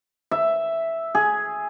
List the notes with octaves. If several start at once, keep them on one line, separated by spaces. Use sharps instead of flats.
E5
G#4